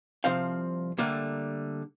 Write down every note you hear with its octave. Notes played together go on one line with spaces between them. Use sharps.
C2 F3 C4 C5 F5
D3 G3 A3 A#3